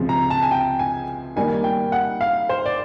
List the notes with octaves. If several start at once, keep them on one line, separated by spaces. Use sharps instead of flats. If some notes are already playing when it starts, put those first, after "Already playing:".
Already playing: C#2 C3 F3 G#3
A#5
A5
G#5
G5
G#5
D#3 G3 A#3 G#5
G5
F#5
F5
C5
D5